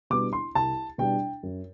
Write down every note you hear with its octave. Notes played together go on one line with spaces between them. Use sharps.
B2 G3 B3 D4 D6
C6
C2 A5
B2 G3 B3 D4 G5
F#2